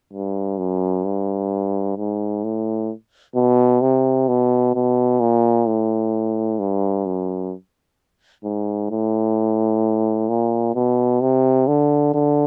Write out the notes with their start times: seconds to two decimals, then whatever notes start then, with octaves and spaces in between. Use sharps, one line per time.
0.13 G2
0.58 F#2
1.05 G2
1.97 G#2
2.44 A2
3.35 B2
3.81 C3
4.28 B2
4.75 B2
5.20 A#2
5.67 A2
6.59 G2
7.06 F#2
8.44 G#2
8.90 A2
10.29 A#2
10.75 B2
11.21 C3
11.67 D3
12.14 D3